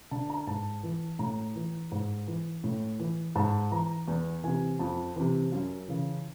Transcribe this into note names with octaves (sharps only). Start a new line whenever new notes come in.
D3 A5
A#5
G#2 A5
E3
A2 A#5
E3
G#2
E3
A2
E3
G#2 A5
E3 A#5
E2
C3 E3 G#5
F2 A5
C3 E3
F#2
C#3 E3